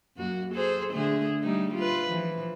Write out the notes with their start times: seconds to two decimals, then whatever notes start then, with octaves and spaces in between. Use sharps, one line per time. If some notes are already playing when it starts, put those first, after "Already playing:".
0.17 F#2 A#3 F#4
0.52 G#4 A4 C5
0.93 D3 A3 G#4
1.42 G3 A3 D#4
1.74 F4 B4
2.07 E3 F3